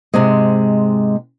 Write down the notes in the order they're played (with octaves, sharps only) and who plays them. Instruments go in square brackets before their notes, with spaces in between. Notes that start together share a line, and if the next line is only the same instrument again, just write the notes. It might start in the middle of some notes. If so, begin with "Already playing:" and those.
[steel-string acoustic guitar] G#2 C3 G#3